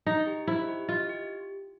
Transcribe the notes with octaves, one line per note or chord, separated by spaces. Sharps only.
D#4 D#5
G4
E4 C5
G4
F4 D#5
G4